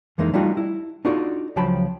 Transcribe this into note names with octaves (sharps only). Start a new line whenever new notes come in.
F2 E3 G#3 A#3 D#4
G3 A3 D4 D#4 F4 F#4
E4
D4 D#4 F4 F#4 A4 D5
C#2 F3 F#3 G5 A5 B5